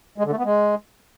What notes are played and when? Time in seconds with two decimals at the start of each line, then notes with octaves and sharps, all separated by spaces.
0.18 G#3
0.25 D3
0.31 A3
0.38 B3
0.44 G#3